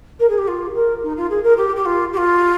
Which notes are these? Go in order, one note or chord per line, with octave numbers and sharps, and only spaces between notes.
A#4
G#4
G4
F4
A#4
D#4
F4
G#4
A#4
G4
G4
F4
G4
F4